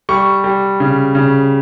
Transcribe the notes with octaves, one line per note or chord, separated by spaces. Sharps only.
G3 C#6
G3
C#3
C#3